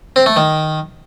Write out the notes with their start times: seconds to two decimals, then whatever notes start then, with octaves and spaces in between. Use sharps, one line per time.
0.16 C4
0.26 A3
0.36 D#3